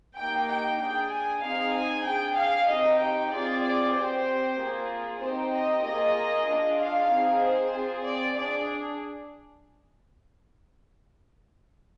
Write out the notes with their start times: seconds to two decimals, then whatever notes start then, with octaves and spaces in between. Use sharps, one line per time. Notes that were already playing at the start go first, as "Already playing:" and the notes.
0.16 A#3 D#4 G4 G5
0.48 G5
0.80 D4 G#4 G5
1.11 G#5
1.42 C4 D#4 G#4 F5
1.74 G#5
2.05 D4 G#4 G5
2.37 F5
2.68 C4 D#4 G4 D#5
3.00 G5
3.31 C4 F4 G#4 D5
3.63 D5
3.94 C4 G4 C5
4.57 A#3 F4 G#4
5.20 C4 D#4 G4 C5
5.52 D#5
5.83 A#3 F4 G#4 D#5
6.47 D4 F4 G#4
6.78 F5
7.10 C4 D#4 G#4
7.41 C5
7.73 C4 F4 G#4
8.04 D5
8.35 D4 G#4 D5